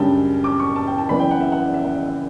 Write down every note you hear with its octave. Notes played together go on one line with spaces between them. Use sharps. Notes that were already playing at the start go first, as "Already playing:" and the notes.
Already playing: F#2 C#3 G3 D4 G5 A5
D6
C#6
A5
G5
A5
F#1 E2 C#3 E3 B3 B5
G5
F#5
E5
F#5
D5
E5
F#5
E5
E5